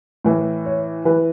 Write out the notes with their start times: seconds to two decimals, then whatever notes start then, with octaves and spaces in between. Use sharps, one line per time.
0.24 A2 E3
0.65 C#5
1.05 E3 B4